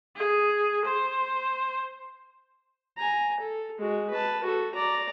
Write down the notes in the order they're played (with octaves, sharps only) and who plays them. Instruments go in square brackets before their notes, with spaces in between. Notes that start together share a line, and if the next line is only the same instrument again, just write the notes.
[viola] G#4
C5
[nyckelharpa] G#5 A#5
A4
G#3 F#4
B4 A5
F#4 A4
D5 A#5